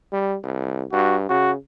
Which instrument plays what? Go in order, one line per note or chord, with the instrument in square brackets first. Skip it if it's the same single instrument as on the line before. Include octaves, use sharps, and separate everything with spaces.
[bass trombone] G3
C2
[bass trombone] G2 [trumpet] F#4
[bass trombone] C#3 [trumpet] F#4